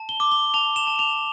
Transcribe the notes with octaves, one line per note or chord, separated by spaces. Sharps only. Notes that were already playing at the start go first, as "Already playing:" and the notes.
Already playing: A5
G7
D6
G7
A5 F7
E7
A5
F7